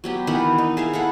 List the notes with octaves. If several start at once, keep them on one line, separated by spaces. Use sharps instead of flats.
F#3 B3 G4
D#3 E3 B3 F#5
D#4
G#4 E5 F5
E4 A4 F#5